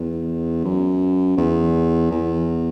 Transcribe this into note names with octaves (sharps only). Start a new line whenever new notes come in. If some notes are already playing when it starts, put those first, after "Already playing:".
Already playing: E2
F#2
E2
E2